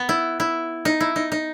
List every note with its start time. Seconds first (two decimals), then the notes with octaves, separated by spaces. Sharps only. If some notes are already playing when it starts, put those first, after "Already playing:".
Already playing: B3
0.09 E4
0.40 E4
0.85 D#4
1.00 E4
1.16 D#4
1.32 D#4